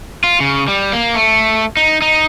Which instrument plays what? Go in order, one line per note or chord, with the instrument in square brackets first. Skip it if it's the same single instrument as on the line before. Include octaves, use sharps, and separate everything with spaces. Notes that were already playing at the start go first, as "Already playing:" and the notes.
[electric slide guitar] F4
C#3
G3
A#3
A3
D#4
D#4